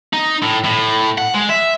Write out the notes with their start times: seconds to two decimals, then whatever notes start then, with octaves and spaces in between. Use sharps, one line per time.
0.13 D#4
0.43 A2
0.65 A2
1.18 F#5
1.34 G#3
1.50 E5